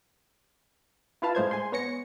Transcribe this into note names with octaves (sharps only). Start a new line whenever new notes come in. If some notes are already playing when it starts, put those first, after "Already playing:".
E4 F4 B4 F5 A5
A2 G#3 C5 G#6
G#5 C6
B3 C#5 A#6 C#7